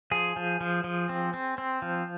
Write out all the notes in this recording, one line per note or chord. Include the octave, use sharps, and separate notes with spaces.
F3 G#4
F3
F3
F3
C4
C4
C4
F3